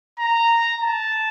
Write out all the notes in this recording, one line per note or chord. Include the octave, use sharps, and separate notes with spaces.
A#5
A5